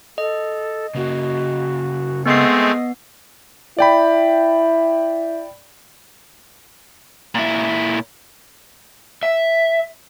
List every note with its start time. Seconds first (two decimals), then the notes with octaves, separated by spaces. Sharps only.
0.18 A4 D#5
0.96 C#3 A#3 F#4
2.26 G#3 A3 B3 C4 D#5 C7
3.79 E4 D5 G5 B5
7.35 A#2 E4
9.23 E5